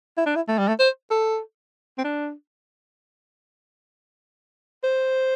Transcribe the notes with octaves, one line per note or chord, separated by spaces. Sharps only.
E4
D4
E4
A3
G3
A3
C5
A4
C4
D4
C5